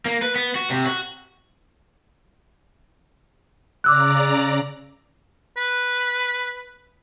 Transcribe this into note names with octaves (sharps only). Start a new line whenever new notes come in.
A#3
B4
B3
F#4
C3
F#4
C#3 D5 A#5 D6 E6 F#6
B4